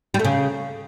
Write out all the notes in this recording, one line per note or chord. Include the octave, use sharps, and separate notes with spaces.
G3
A3
C#3